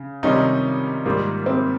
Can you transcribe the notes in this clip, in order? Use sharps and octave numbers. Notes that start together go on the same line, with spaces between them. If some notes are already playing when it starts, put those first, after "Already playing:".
Already playing: C#3
C3 D#3 G3 C#4 D#4 F4
G#2 D#3 G3 A#3 F4
C4